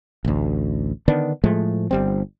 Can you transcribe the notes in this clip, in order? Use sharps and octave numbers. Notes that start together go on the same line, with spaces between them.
A1 D2
D3 D#3 B3 D4
A2 F3 G#3 A3
G1 G3 C4